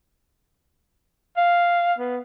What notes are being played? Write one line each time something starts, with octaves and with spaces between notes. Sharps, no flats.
F5
B3